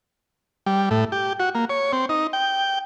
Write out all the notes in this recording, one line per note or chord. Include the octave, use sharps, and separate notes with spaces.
G3
A2
G4
F#4
A#3
C#5
C4
D#4
G5